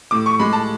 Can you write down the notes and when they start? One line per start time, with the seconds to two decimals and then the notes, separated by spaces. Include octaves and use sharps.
0.11 A2 D6
0.26 C#6
0.40 G#3 B5
0.53 A5